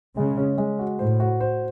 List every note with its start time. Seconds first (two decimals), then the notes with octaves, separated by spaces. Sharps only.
0.16 C#3 G#3
0.37 C#4
0.58 G#3
0.79 F#4
0.99 A2 C5
1.20 F#4
1.41 C5